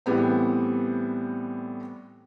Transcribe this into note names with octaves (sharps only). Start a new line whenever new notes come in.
A2 E3 G3 B3 C4